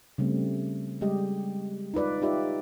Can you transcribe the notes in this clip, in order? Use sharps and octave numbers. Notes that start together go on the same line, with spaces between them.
C#3 G3 A3 C4
G3 G#3 G4 D#5
D#4 F4 B4 D5
D#4 F4 G4 B4 D5 E5